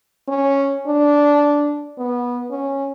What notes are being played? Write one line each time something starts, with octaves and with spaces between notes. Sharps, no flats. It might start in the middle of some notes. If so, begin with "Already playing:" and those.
C#4
D4
B3
C#4